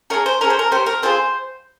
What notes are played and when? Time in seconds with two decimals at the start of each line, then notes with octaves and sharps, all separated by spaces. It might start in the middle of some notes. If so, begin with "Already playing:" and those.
0.10 C#4 F4 G#4 A#4
0.26 C5
0.41 C#4 G#4 A#4
0.50 C5
0.59 A#4
0.71 C#4 G4 C5
0.86 A#4
1.02 C4 F4 G#4 C5